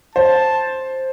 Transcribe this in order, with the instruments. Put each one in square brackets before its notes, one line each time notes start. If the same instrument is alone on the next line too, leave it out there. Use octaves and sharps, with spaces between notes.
[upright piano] C5 [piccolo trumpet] A5